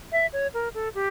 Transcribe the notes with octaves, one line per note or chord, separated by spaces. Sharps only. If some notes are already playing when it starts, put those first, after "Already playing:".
E5
C#5
A#4
A4
G4